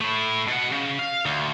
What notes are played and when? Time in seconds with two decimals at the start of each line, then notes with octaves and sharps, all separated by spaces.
0.01 A3 E4
0.48 B2 F#5
0.72 C#3
0.99 F5
1.26 D2